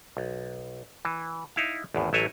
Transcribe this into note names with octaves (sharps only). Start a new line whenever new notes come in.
B1
E3
D#4 E4 F5
G#1 E2 A2
A1 F#3 E4 A4 G#5 A#5